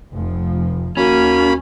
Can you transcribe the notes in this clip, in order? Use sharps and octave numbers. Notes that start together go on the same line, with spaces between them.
F1 F3
D#2 A#3 C#4 F#4 B5